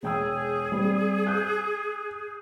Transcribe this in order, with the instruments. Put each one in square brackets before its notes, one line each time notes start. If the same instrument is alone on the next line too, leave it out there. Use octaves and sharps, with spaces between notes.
[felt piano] E1 G5 E6 [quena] G#4
[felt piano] G3 C4
F#6 G6